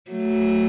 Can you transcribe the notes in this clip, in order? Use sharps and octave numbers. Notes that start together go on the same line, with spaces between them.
F#3 A3